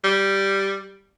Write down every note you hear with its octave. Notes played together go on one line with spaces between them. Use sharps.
G3